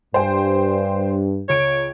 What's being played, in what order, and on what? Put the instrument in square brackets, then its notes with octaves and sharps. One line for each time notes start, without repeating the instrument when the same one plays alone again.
[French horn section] G2 [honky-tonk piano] C5 G5 G#5
[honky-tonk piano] C#2 D7 [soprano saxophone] C#5